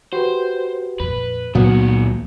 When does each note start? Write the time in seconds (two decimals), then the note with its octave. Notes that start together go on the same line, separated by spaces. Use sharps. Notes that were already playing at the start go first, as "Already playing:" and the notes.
0.13 F#4 G4 B4 C5
1.00 F2 A#2 B4
1.55 C#2 A#2 D#3 F3 F#3 B3 F#4